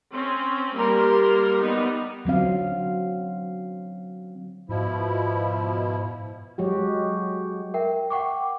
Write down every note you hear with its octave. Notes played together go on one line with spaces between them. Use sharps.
C4 C#4
G3 A#3 A#4 C6
G3 B3 D#4
D3 F#3 C4 F5
G#2 B2 F3 E4
F#3 G#3 F#4 G4
A#4 E5 G5
F#5 G5 C#6 D6